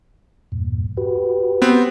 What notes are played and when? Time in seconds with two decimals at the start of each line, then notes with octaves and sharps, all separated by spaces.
0.52 E2 G2 A#2
0.97 F#4 G4 B4
1.62 B3 C4